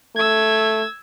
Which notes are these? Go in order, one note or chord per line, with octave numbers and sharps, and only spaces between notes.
A3 E6 G#6